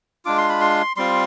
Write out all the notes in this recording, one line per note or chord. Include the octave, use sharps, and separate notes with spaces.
G#3 D4 F4 D6
C6
B5
C6
G3 C4 F4 C6